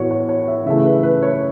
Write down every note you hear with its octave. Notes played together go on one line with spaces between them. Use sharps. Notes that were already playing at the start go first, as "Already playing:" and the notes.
Already playing: A2 E3 B3 F#4 C#5
C#5
C#5
E5
C#3 E3 A3 E5
B4
B4
C#5